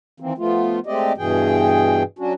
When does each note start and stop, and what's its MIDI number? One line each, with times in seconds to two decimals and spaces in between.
0.20 0.33 51
0.20 0.33 52
0.20 0.33 58
0.20 0.33 60
0.38 0.79 53
0.38 0.79 57
0.38 0.79 59
0.38 0.79 65
0.86 1.13 56
0.86 1.13 57
0.86 1.13 60
0.86 1.13 67
0.86 1.13 74
0.86 1.13 75
1.18 2.03 43
1.18 2.03 47
1.18 2.03 52
1.18 2.03 68
1.18 2.03 79
2.19 2.33 54
2.19 2.33 61
2.19 2.33 62
2.19 2.33 66